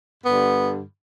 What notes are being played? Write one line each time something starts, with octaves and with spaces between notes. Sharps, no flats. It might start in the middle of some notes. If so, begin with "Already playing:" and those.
G2 D3 B3